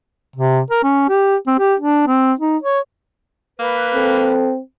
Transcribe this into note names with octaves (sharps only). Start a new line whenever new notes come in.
C3
A#4
C#4
G4
C4
G4
D4
C4
D#4
C#5
A#3 B4
C4 A4